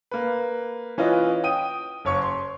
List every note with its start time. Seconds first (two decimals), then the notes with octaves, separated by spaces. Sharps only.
0.11 A#3 B4
0.98 E3 C#4 F4 B4 D#5
1.44 G5 D#6 D#7
2.05 F#1 C#5 C#6
2.22 C6